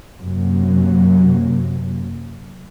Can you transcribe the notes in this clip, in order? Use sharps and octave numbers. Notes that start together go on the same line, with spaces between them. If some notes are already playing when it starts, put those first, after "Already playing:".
F#2 C3 F#3 A#3